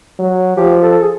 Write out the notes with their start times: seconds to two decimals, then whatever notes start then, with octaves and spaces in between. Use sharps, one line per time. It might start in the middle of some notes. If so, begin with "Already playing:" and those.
0.19 F#3
0.57 F3 G4
0.82 A4
1.02 G#4